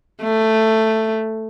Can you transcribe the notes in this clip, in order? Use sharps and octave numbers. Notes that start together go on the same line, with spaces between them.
A3